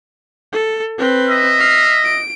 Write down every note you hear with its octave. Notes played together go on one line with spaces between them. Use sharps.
A4
C4 B4
D#5 E5
F6 C7
D7